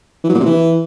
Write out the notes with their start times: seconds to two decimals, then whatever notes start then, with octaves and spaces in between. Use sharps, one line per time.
0.24 E3
0.29 F#3
0.34 A#2
0.40 C3
0.45 E3